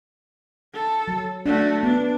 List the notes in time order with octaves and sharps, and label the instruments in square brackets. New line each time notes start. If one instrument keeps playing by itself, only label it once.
[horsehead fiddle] A4
[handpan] F#3
[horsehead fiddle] A3 F#4 [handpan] D4
[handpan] B3 [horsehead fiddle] D4